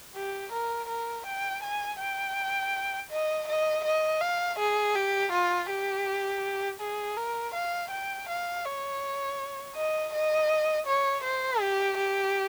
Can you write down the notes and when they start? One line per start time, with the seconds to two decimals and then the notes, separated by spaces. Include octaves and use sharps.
0.15 G4
0.52 A#4
0.89 A#4
1.26 G5
1.63 G#5
2.00 G5
3.11 D#5
3.48 D#5
3.85 D#5
4.21 F5
4.59 G#4
4.95 G4
5.32 F4
5.69 G4
6.81 G#4
7.17 A#4
7.54 F5
7.91 G5
8.28 F5
8.64 C#5
9.76 D#5
10.13 D#5
10.87 C#5
11.24 C5
11.61 G4
11.97 G4